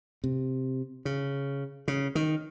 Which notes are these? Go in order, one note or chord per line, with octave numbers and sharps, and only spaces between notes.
C3
C#3
C#3
D#3